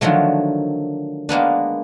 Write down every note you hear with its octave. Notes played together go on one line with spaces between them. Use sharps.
D3 D#3 F3 F#3 A3
G#3 A#3 B3 D4